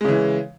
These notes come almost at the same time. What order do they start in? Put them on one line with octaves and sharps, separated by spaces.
G#3 C#3 E3